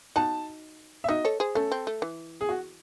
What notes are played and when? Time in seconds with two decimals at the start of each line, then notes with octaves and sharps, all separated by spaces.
0.16 D#4 F#4 A5
1.04 E5
1.09 D#4 F#4 D#5
1.25 A4 C#5
1.40 G#4 C5
1.55 A3 C#4 A4
1.72 C4
1.87 A3
2.02 E3
2.41 G#4
2.49 F#4